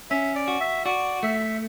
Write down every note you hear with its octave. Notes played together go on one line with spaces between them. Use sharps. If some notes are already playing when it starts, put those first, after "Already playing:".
C#4 E5
D5
F#4
E5
F#4 D5
A3 E5